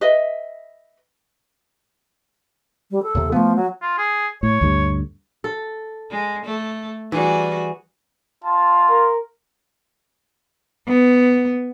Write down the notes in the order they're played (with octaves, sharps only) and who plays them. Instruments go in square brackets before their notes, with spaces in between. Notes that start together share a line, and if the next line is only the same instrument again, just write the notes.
[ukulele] B4 D#5 E5
[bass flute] G3
A4
[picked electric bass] D#2 C3
[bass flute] F3 [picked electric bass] A3 B3
[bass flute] F#3
[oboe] F4
G#4
[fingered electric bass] A2 [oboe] C#5
[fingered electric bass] D2 G2 D3
[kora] A4
[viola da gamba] G#3
A3
[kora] E3 [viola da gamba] G3 F#4 G#4
[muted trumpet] F4 [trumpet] A5
[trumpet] A#4
[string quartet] B3